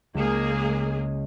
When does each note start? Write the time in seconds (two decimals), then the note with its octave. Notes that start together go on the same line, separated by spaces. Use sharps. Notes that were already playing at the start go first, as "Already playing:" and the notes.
0.14 C#2 G#3 A#3 G#4